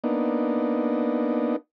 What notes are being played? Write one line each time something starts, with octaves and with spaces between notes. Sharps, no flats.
A#3 B3 D4 D#4